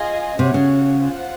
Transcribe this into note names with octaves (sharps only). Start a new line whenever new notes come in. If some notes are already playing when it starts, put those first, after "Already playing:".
Already playing: F4 G#4 D#5 G#5
C3 C#4 F#4 C#5 F#5
C#3
F4 C5 F#5